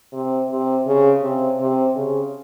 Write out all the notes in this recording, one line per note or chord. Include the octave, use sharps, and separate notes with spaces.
C3
C3
C#3
C3
C3
C#3